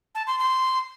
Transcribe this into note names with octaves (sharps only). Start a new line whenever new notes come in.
A5
C6
C6